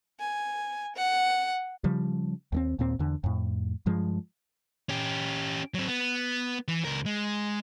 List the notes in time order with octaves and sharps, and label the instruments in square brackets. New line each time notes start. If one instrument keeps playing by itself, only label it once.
[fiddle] G#5
F#5
[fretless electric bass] C#3 F3 G3
D#2 A3 C4
D#2 A#2 C4
E2 D3
F2 A2
G2 F3 G#3
[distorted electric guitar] C#4 G4
F#3 C4
B3
E3
C#2 A#4
G#3